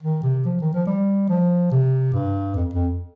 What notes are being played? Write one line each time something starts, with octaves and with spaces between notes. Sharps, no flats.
D#3
C3
F3
D#3
F3
G3
F3
C3
G2
F2
F2